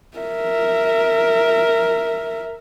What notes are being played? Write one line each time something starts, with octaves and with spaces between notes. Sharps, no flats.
A#4 E5